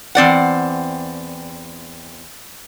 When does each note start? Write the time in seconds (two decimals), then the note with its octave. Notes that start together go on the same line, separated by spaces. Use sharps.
0.15 E2 C4 D5 F#5